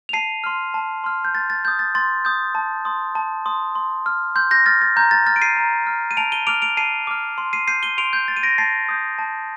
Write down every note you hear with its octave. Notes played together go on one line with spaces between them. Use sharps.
F7
A5 C7 D#7
C6 F6
A5
C6 F6
G6
C6 A6
A6
D#6 G6
A6
C6 A6
D#6 G6
A5
C6 D#6
A5
C6 D#6
C6
F6
C6 G6
G6 A#6
F6 A6
A6
A#5 G6
A6
F6 A6
D7
C7 D#7
A#5
F6
D#7
A5 D7 F7
D#7 G7
D6 F6 D7 F7
D7 F7
A5 C7 D#7
D6 F6
C6
C7 D#7
G6 C7 D#7
D#7 G7
C6 D7 F7
G6
G6 A6
D#7
A#6 D7
A5 A6 C7
D#6 G6
A5